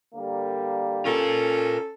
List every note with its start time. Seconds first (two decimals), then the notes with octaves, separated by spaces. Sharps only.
0.14 D3 G3 A#3
1.05 C#4 F4 A4 A#4